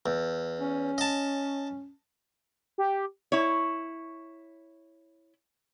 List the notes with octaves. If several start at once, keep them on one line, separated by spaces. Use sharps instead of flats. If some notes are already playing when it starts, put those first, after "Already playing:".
E2
C#4
D#5 A5
G4
E4 C#5